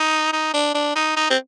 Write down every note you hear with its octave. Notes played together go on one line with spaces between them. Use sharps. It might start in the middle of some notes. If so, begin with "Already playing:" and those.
Already playing: D#4
D#4
D4
D4
D#4
D#4
C4